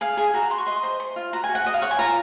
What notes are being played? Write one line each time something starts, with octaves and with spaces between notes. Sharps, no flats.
G#4 F5
G#4 G#5
F#4 A#5
F#4 C6
C#6
D#5 C6
C5
C5 C6
F4
F#4 A#5
G#5
F#4
F#5
F#4 D#5
F5
C#5 F#5
G#5
F4 A#5